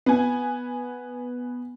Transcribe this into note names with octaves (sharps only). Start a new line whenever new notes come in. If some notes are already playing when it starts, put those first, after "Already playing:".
B3 G#5